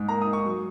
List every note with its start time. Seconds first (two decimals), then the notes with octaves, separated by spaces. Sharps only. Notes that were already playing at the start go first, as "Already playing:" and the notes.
Already playing: G#2
0.08 A#3 A#5
0.22 D#6
0.27 D#4
0.33 C#6
0.45 F#3